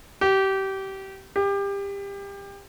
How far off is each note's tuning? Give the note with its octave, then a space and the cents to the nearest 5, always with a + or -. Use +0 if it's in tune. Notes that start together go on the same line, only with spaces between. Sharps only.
G4 -25
G4 +25